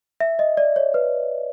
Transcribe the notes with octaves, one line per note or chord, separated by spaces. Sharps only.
E5
D#5
D5
C#5
B4